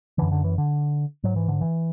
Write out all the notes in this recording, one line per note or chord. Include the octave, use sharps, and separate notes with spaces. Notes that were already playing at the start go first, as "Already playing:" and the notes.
F#2 D3 E3
D3
E3
D3
G#2 F#3
E3
D3
E3